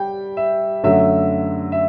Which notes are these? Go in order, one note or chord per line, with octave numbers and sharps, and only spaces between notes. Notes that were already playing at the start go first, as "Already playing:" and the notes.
Already playing: G3 G5
E5
F#2 D3 F#3 A3 E5
E5